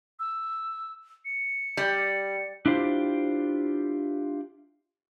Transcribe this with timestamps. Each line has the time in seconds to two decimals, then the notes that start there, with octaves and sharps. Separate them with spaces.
0.19 E6
1.25 C#7
1.77 G3
2.66 D4 E4 F4 G4 C5